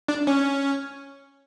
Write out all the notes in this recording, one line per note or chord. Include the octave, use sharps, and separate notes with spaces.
D4
C#4